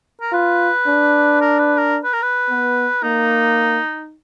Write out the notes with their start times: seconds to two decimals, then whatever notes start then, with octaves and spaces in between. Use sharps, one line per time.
0.21 A#4
0.33 F4 B4
0.87 D4
1.41 A#4
1.59 B4
1.77 A#4
2.04 B4
2.13 A#4
2.23 B4
2.49 B3
3.03 A#3 D#4